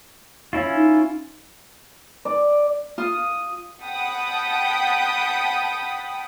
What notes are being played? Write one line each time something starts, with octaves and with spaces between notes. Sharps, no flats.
C#4 E4 F4
D#4
D5
F4 D#6
F#5 G5 A5 B5 D#6